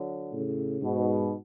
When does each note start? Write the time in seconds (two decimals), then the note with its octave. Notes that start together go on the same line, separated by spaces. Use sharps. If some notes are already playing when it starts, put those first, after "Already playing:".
Already playing: D3 F#3
0.33 A2 C#3
0.82 G#2 B2